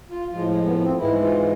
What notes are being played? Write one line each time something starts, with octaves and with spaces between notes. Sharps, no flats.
F4
A2 F3 G#3 F4
G#3
B3
B3
C4
G#2 E3 G#3 E4
F4